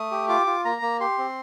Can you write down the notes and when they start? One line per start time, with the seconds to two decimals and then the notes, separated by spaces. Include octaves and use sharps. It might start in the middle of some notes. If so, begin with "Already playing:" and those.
Already playing: A3 D#6
0.11 G4
0.29 F4 D6
0.46 F4
0.65 A#3 A#5
0.82 A#3
1.00 G4 C6
1.18 C4